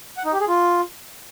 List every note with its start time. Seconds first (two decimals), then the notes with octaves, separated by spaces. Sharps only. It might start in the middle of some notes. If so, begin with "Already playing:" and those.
0.17 F#5
0.25 D#4
0.33 G4
0.40 G#4
0.48 F4